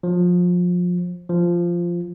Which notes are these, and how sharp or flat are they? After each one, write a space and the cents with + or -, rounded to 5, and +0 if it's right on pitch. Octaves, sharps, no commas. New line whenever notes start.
F3 +25
F3 -10